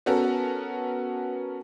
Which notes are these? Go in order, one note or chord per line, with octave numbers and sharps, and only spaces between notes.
B3 C#4 F#4 A4 A#4